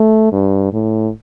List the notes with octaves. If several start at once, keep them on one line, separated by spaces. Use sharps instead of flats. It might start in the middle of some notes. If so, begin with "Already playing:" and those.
Already playing: A3
G2
A2